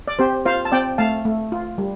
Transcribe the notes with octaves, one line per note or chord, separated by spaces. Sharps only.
D5
C4 G4 C5
F4 C5 F5
A5
C4 D5 G5
A3 F5 A5
A3
F4
G3